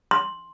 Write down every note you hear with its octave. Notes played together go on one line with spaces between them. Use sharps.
C6